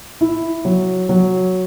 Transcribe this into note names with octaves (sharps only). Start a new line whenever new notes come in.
E4
F#3
F#3